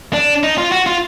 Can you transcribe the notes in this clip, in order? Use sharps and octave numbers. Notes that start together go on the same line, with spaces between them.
D4
D#4
F4
F#4
F4